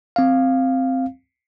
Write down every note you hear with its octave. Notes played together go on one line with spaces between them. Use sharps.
C4 F5